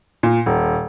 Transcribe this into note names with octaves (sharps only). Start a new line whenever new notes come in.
A#2
D#1